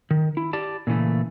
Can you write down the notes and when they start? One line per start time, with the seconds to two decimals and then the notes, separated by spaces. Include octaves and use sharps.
0.11 D#3
0.37 E4
0.53 G4 D5 A5
0.87 A#2 C#3 E3 A3